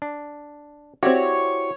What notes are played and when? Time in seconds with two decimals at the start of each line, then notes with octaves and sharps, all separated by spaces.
0.02 D4
1.03 C4 E4 F#4 G4 C#5 D5